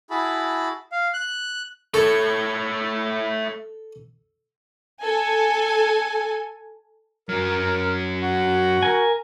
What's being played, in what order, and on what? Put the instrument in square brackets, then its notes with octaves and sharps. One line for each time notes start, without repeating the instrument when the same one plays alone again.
[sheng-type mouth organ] E4 F#4 G#4 A5 B5
F5
F#6
[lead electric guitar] A3 C#5 [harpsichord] A4
[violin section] A4 G#5
[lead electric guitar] F#2 F#3 [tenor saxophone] A#4
[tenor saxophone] F#4
[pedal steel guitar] A#4 G#5